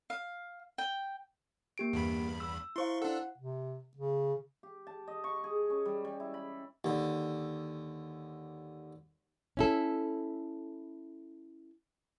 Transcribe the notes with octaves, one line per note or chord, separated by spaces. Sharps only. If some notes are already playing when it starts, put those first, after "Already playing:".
F5
G5
A#3 G4 D7
E2 G2 B5
E6
E4 C5 F5 C6 C#6
D4 A4 F#5
C3
C#3
G4
A5
D#5
C#6
G#4
C#4
G3
G3
E4
B5
D#2 D3
C#4 E4 A4